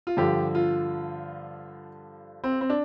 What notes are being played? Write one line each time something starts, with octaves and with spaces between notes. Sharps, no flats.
F4
G2 D3 F3 G4
F4
C4
C4
D4